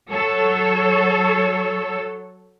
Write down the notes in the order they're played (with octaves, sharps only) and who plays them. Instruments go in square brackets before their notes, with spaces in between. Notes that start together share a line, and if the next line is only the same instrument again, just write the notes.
[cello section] F#3 A4 C#5